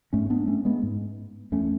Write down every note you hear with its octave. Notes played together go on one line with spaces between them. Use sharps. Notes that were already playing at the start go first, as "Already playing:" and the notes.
G#2 A3 C#4
B3 D4
A3 C#4
G#3 B3
G#2
E2 A3 C#4